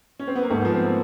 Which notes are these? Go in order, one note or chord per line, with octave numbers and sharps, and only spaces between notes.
C#4
C4
B3
A#3
G#2 A3
F3 B3
C4
A#3